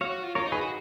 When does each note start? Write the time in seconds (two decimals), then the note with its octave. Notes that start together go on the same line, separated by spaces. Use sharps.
0.01 F#4 C#5 F5
0.23 F4
0.35 F4 A#4 C#5
0.46 D#4
0.52 G#4 B4
0.61 F#4